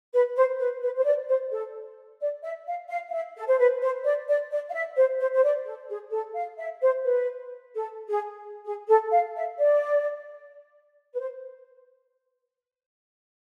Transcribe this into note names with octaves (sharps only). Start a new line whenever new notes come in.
B4
C5
B4
B4
C5
D5
C5
A4
D5
E5
F5
F5
F5
E5
A4
C5
B4
C5
D5
D5
D5
F5
E5
C5
C5
C5
D5
A4
G#4
A4
F5
E5
C5
B4
A4
G#4
G#4
A4
F5
E5
D5
B4
C5